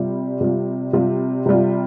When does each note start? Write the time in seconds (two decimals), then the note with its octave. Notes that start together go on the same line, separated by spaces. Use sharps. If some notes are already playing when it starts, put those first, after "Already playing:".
Already playing: C3 G3 F4
0.41 C3 G3 F4
0.93 C3 G3 F4
1.46 C3 G3 F4